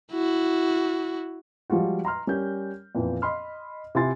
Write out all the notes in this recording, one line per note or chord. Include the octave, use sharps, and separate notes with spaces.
E4 F#4
F3 G3 G#3 F4 F#4
A#5 C6 F6
G3 C#4 A#4 G6
F2 A#2 E3 B3
D#5 B5 C6 F6
C3 E4 F4 G#5 C6 A6